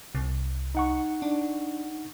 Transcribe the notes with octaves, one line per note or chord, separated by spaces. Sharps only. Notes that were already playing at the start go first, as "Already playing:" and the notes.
C2
D#4 F#5 C#6
D4